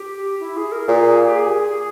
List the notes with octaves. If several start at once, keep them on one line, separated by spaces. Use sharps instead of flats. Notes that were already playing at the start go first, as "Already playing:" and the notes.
Already playing: G4
E4
G#4
A#4
A#2 G#4
G4
G#4